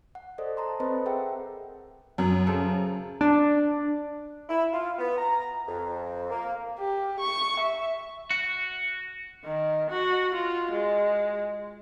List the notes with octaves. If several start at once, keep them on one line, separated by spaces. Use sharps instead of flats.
F#5
A4 C5 D5 D#5
A5 A#5 C6
C4 A4 B4 C5 D#5 B5
G#4 A#4 E5 F#5 G5
F#2 F#3
C#3 A4 C5
D4
E4
F4
B3
A#5
F2
A#3
G4
C#6
E5
F#4
D#3
F#4
F4
G#3